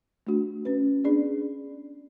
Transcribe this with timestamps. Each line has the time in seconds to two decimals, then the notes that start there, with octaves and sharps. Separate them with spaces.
0.27 A3 D4 F#4
0.65 C#4 F#4 B4
1.05 B3 D4 G#4 D5